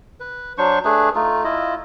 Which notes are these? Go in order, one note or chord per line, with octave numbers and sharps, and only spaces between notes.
B4
F#3 D4 C5 C#6
A3 D4 G#4 B4
A3 D#4 F4
E4 F4 D#5